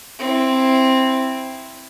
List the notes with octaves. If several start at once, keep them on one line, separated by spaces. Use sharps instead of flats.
C4 E4